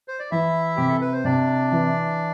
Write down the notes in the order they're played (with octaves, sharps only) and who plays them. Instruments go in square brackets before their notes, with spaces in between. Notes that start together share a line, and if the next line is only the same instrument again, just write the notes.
[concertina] C5
D5
[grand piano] E3 [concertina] E4 E5
[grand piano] C3 [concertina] G4
[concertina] A4
B4
C5
[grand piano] C3 [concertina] D4 D5
[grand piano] E3